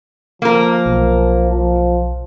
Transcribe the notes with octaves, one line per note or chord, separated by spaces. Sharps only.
F3 A#3 A#4
B1
F3